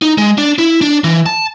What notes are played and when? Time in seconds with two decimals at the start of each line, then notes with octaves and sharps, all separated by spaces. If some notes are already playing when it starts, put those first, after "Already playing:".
0.02 D#4
0.18 G#3
0.38 D4
0.59 E4
0.81 D4
1.04 E3
1.26 A5